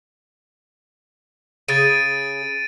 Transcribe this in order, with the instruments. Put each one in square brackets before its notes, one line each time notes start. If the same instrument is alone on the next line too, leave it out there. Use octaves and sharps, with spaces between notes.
[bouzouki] C#3 G#4 [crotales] A6 D7 D#7